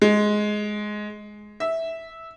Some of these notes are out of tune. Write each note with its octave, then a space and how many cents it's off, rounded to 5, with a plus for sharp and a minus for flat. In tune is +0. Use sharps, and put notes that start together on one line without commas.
G#3 +10
E5 -10